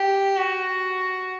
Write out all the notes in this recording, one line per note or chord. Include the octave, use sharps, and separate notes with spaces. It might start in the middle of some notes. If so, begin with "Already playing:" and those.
Already playing: G4
F#4